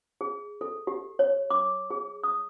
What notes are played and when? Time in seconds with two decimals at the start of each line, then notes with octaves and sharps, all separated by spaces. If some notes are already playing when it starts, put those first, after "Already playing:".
0.21 G#4
0.61 A4
0.87 G4
1.19 C#5
1.50 D6
1.91 G#4
2.24 D#6